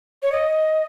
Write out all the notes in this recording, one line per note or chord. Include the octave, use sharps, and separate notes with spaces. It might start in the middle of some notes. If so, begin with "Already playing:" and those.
C#5
D#5